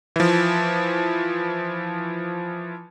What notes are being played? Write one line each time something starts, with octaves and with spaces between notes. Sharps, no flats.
E3 F3